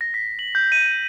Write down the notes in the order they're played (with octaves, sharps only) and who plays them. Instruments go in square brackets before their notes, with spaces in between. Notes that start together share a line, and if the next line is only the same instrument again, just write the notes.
[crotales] A#6
B6
F#7
G6
D#7